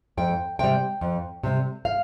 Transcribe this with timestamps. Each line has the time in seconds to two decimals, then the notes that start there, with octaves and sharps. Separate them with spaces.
0.17 F2 G5
0.59 C3 G3 G5
1.01 F2
1.43 C3 G3
1.85 F5